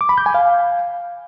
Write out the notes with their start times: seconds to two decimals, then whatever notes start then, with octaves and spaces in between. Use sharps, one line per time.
0.01 D6
0.09 B5
0.18 G6
0.26 G#5
0.34 F5